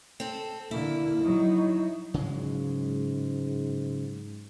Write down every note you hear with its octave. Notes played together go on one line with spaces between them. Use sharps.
C4 A4
D3 A#3 E4
F#3 D#4
G#2 C#3 F#3 G#3